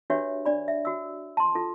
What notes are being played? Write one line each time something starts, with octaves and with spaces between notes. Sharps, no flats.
D4 F#4 G4 B4 C#5 E5
D4 D5 B5
E5
F#4 E6
A5 C6
F4 A4